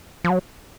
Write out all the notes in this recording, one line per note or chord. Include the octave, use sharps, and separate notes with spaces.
F3
F#3